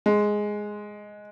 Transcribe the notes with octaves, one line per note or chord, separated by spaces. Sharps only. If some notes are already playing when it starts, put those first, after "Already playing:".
G#3